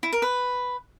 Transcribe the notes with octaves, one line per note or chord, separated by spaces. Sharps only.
E4
A#4
B4